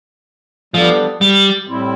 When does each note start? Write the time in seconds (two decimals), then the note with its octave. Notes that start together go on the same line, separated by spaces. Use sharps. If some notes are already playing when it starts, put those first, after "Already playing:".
0.74 F3 G3 B3 D4 A4 D5
1.21 G3
1.67 A2 G3 C4 E4